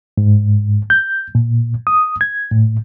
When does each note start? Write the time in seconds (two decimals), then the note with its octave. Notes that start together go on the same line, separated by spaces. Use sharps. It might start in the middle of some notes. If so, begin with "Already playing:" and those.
0.18 G#2
0.90 G6
1.35 A#2
1.87 D#6
2.21 G#6
2.51 A2